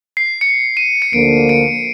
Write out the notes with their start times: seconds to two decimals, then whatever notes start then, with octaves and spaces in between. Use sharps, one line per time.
0.17 C7
0.41 C#7
0.77 D#7
1.02 C#7
1.13 D2 D3 F3 A#3 D7
1.49 D7